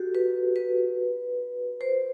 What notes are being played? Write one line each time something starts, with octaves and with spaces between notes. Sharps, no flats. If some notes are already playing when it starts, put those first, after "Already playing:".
Already playing: F#4 G4 A4
B4
B4
C5